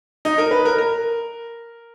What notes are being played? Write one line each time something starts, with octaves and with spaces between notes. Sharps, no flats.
D#4
A#4
B4
A#4
A#4